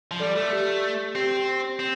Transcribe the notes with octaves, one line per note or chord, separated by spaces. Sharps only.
F3
G3 A4 D5
A3 A4
G4
C4 G4
C4